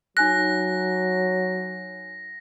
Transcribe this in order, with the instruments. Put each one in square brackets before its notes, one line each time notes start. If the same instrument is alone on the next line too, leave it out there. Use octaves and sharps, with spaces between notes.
[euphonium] F#3 [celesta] D#4 G#5 F#6 [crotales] A#6